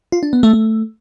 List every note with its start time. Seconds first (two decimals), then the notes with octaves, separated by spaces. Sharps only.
0.12 F4
0.23 D4
0.33 B3
0.43 A3
0.53 A3